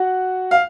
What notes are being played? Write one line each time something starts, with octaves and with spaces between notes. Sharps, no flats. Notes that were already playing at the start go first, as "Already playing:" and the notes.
Already playing: F#4 F#5
F5